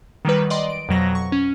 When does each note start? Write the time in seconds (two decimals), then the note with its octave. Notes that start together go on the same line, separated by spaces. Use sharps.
0.25 D#3 F#3 G3 B4
0.50 D5 D#5 C6
0.70 D7
0.89 F2 B2 F#3 A#6
1.15 C#6
1.32 C#4